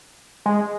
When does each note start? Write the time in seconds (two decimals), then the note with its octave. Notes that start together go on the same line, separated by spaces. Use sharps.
0.46 G#3